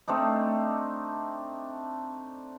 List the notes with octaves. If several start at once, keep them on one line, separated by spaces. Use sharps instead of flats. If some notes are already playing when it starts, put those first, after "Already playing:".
A3 C4 D4 D#4